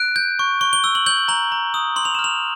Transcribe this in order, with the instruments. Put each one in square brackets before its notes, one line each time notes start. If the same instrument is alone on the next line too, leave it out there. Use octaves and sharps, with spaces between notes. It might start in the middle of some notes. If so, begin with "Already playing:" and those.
Already playing: [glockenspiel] F#6 D7
G6
C#6
C#6 G7
G7
E6 G7
F#7
G6 F#7
A#5 F#7
A#5
D#6
C6 F#7
F7
E7
F6
F7